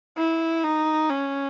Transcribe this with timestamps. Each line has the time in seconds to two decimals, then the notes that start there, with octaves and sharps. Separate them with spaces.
0.17 E4
0.63 D#4
1.09 C#4